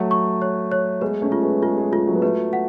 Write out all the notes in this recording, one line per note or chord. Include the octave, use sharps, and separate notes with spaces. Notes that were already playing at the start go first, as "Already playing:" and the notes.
Already playing: F#3 A3 C#5 F#5
C#6
C#5
C#5
G#3 B3 B4
A3 C#4
F4
G#3 B3
G#3 F4
G#3
G#3 F4
F#3 A3
B3
F#3 A3 B4
F#5